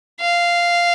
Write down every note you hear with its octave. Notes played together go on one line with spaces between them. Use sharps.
F5